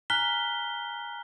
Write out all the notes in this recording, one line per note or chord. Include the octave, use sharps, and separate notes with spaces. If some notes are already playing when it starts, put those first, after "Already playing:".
G#5 A#5 F6 F#6 B6 G7